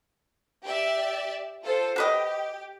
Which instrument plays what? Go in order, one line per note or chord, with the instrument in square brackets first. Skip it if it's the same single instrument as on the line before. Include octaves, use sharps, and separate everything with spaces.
[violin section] G4 D5 E5
F4 A4 C5
[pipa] F#4 B4 D#5 [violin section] G4